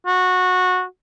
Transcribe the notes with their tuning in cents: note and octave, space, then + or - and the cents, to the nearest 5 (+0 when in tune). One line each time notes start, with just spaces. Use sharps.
F#4 -15